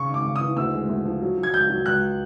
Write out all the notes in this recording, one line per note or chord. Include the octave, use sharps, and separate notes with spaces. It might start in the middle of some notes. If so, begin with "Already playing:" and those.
Already playing: C#3 C#6
G#1
D6
C#3
E3 D#6
D2 E6
G#3
D2
F3
F#3
F#3
G#6
C#2 G6
F#3
C#2 F#6